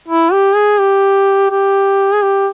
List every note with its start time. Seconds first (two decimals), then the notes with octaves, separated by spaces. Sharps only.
0.08 E4
0.32 G4
0.55 G#4
0.79 G4
1.51 G4
2.14 G#4
2.22 G4